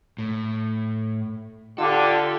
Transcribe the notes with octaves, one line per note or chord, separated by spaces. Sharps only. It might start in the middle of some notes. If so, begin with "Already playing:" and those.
A2
D3 F4 G4 A4